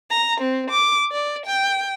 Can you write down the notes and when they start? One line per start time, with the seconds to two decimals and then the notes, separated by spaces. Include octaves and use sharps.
0.11 A#5
0.41 C4
0.71 D6
1.12 D5
1.46 G5